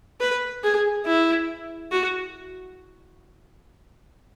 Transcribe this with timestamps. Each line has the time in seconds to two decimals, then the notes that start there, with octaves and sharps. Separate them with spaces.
0.20 B4
0.64 G#4
1.06 E4
1.92 F#4